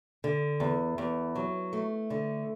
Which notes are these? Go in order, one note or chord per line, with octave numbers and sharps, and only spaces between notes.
D3
E2
E2
F#3
A3
D3